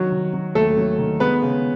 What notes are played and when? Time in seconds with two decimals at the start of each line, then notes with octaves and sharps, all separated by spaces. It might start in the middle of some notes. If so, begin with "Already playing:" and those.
Already playing: D#3 F#3 F#4
0.11 D#3
0.34 F#3
0.55 D#2 A3 A4
0.77 F#3
0.99 D#3
1.20 G#3 B3 B4
1.42 C#3